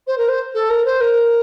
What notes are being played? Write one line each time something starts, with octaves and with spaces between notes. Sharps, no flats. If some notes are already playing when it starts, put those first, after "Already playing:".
C5
A#4
C5
A4
A#4
C5
A#4